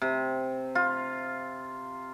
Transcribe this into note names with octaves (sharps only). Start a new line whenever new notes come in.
C3
F4